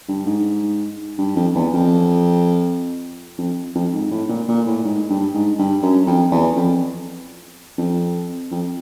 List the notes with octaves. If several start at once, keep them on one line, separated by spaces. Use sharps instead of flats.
G2
G#2
G2
F2
E2
F2
F2
F2
G#2
A2
A#2
A#2
A2
G#2
G2
G#2
G2
F#2
F2
E2
F2
F2
F2